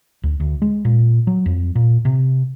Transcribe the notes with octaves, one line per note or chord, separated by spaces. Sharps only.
D2
D2
G#3
A#2
F#3
F2
A#2
C3